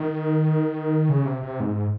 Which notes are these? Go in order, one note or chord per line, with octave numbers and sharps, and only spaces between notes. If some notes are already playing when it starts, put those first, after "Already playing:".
Already playing: D#3
C#3
C3
C3
G#2